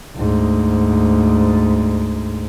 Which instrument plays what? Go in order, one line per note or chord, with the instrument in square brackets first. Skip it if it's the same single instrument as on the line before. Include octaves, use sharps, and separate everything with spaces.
[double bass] D2 G#2